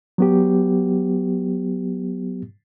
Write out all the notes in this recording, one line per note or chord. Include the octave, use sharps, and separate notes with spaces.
F#3 B3 G4